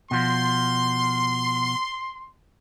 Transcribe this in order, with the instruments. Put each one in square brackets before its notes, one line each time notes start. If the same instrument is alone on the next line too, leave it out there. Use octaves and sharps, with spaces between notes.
[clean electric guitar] B2 F3 [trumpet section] C6